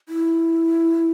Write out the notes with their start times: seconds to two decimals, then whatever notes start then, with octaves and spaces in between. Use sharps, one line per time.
0.09 E4